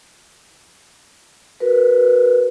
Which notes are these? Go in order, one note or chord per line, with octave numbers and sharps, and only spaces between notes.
F#4 A#4 B4